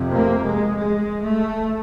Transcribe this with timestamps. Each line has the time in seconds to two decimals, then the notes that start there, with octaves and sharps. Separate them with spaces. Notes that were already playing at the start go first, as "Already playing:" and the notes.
Already playing: F2 C3
0.13 A#3
0.45 G#3
0.77 G#3
1.24 A3